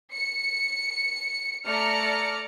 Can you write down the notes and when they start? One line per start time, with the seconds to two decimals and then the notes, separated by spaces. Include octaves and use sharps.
0.13 C#7
1.65 A3 D5 A#5 F6 C#7